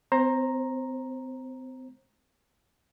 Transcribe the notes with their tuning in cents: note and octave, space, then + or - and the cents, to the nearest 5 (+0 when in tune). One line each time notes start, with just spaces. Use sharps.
C4 -35 C5 +25 A#5 +0